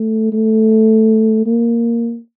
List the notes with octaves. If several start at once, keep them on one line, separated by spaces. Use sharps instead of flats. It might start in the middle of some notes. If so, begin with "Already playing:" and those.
Already playing: A3
A3
A#3